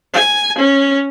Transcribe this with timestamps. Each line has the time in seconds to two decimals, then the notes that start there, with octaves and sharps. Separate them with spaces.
0.14 G#5
0.59 C#4